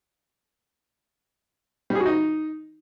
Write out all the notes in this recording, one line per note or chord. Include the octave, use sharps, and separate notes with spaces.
G3
G#4
F#4
D#4